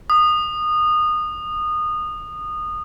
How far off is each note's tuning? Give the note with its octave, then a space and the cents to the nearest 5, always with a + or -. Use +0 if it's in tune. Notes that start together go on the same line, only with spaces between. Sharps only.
D#6 -25